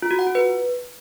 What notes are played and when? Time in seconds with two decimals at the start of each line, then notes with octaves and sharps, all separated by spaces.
0.02 F4
0.11 F#4
0.19 F#5
0.27 F4
0.35 B4